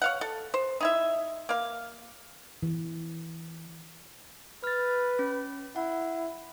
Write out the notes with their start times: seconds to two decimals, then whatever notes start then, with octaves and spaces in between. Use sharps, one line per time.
0.02 C#5 F5 F#5
0.21 A4
0.54 C5
0.81 D#4 E4 E5
1.49 A#3 F5
2.63 E3
4.64 B4 F6 A6
5.19 C#4
5.76 E4 F#5